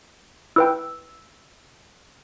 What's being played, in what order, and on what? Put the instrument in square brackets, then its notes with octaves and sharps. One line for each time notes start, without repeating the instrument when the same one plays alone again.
[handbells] E4 B4 G5 [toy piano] E6